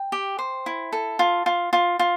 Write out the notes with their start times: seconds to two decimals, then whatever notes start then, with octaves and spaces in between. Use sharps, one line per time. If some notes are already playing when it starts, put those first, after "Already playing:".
Already playing: G5
0.12 G4
0.39 C5
0.66 E4
0.92 A4
1.19 F4
1.46 F4
1.73 F4
1.99 F4